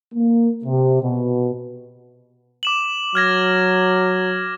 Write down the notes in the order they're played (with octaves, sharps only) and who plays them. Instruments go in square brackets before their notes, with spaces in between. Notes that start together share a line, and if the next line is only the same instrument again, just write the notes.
[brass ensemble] A#3
C3
B2
[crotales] D6 E7 F#7
[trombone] F#3 [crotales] F6 G#6 A#6